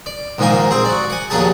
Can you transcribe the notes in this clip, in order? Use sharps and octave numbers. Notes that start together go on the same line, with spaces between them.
D5
A#1 G#2 D#3 A#3 G#5
C4 G#4
F#4 D5
F#5 G#5
A#1 D#2 F#3 D4 G#4 A5